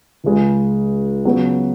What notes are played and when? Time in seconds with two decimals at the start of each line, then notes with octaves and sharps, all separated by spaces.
0.24 C#2 C#3 G#3
1.25 C#3 F#3 B3 F#4 B4